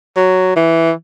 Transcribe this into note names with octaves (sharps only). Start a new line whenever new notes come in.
F#3
E3